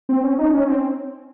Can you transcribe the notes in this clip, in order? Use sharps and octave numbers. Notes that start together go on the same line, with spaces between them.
C4
C#4
D#4
C#4
C4